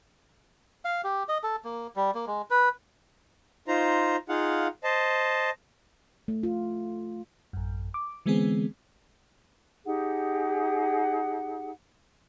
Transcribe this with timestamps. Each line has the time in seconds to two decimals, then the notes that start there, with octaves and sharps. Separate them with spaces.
0.85 F5
1.04 G4
1.28 D#5
1.43 A4
1.65 A#3
1.96 G3
2.15 A#3
2.27 G#3
2.50 B4
3.68 D#4 F4 C5 A#5
4.29 D#4 F4 G#4 F5 F#5
4.84 C5 D#5 A5
6.28 A3
6.43 F4
7.53 A1 F#2
7.94 D6
8.26 D3 E3 G#3 B3 C4 G#4
9.84 D#4 G4 G#4 F#5